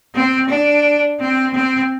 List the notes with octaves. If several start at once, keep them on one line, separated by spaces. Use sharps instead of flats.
C4
D4
C4
C4